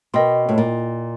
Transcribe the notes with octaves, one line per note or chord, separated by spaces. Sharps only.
B2 A#4 D#5 G5 C6
A2
A#2